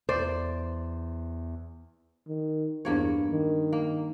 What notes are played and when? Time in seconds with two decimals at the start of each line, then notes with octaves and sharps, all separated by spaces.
0.09 E2 C5 D5
2.27 D#3
2.85 E2 G2 A#3 C#5
3.31 D#3
3.73 A#3